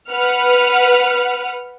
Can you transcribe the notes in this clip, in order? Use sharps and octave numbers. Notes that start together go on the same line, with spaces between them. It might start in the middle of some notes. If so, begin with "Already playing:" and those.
B4 F#5 F6